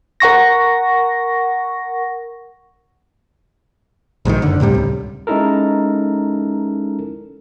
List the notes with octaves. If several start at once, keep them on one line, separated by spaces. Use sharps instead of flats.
A#4 F#5 C#6 A#6
A#1 G#2 B2 D#3
F#1 D3
D2 A2 C3 G3
C#2
G#3 C#4 D#4 E4 A4 A#4